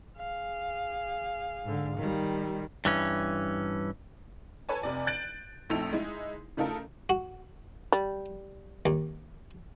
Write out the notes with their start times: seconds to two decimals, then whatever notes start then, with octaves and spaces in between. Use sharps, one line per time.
0.17 G#4 F5
1.63 G#2 D3
1.97 D#3 G3
2.85 G2 E3 C#4
4.69 A4 B4 C#5 G#5 A5
4.82 F1 C3 D5 G#5
5.07 F#6 G6 A6 D7 F#7
5.70 A#1 F2 A3 D#4 E6 F7
5.93 G#3 D#4 E4
6.57 C#3 A3 D#4 F4 A4 A#4
7.09 F#4
7.92 G3
8.86 D#2